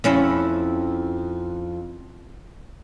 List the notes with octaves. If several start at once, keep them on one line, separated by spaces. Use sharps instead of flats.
F2 C#4 E4